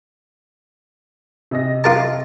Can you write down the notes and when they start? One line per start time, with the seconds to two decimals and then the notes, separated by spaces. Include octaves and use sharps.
1.51 C3 D#5 A#6
1.84 F4 A#4 A5